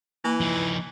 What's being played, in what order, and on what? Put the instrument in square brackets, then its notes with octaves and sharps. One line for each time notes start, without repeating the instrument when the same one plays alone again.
[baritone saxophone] E3 [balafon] A#3
[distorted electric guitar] F3 D#4